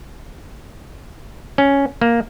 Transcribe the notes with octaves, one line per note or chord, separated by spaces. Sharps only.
C#4
A#3